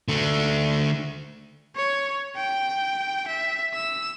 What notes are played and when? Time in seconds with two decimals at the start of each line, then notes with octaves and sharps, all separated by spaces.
0.08 D3 A3
1.76 C#5
2.36 G5
3.27 E5
3.74 E6